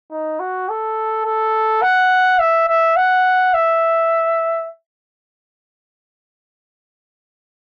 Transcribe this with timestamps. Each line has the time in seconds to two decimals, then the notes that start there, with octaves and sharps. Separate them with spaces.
0.11 D#4
0.40 F#4
0.69 A4
1.25 A4
1.82 F#5
2.39 E5
2.68 E5
2.96 F#5
3.54 E5